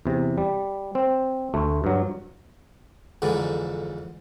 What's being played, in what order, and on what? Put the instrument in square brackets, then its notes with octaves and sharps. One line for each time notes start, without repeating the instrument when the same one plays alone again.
[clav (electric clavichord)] E2 C3
G3
C4
D2 A3
G2 F#3
[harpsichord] F2 G#2 D3 E3